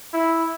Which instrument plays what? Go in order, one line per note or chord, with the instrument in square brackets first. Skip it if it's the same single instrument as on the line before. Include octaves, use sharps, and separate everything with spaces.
[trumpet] E4